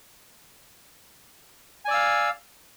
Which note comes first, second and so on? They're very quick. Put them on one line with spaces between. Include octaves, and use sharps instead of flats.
G#5 D5 E6 F5